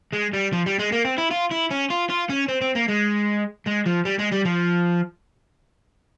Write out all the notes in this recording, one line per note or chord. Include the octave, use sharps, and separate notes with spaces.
G#3
G3
F3
G3
G#3
A#3
C4
E4
F4
E4
C#4
F4
F4
C#4
C4
C4
A#3
G#3
G#3
F3
G3
G#3
G3
F3